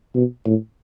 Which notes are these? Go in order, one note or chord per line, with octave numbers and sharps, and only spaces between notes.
B2
A2